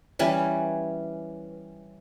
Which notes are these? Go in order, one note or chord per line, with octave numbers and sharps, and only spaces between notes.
E3 G3 C#4 B4